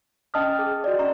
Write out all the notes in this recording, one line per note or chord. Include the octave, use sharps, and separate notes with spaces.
C#4 D#5 G5 A5 D#6 F6
G#4
F#4 D5 D#5
C#4 A#5 C#6